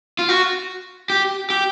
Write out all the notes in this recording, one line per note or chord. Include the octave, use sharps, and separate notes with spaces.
F4
F#4
G4
G4